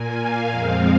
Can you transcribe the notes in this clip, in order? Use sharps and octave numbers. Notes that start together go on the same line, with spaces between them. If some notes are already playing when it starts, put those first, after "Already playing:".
Already playing: A#2 A#3 G#5
F5
F2 F3 G#3 C4